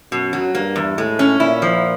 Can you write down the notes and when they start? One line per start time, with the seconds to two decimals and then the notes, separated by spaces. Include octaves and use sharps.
0.12 F#2 B2
0.33 F#3
0.54 G2 A#3
0.76 E2
0.98 A2 G#3
1.19 C#4
1.40 A#2 E4
1.62 F3